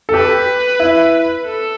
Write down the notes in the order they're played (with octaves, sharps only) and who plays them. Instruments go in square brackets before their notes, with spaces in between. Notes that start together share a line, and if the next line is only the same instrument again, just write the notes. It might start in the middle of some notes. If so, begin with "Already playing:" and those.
[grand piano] A4
[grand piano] G4 [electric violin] B4
[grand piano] E4
[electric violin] A4